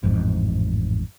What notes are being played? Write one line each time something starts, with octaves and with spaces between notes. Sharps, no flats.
A1 F2 G#2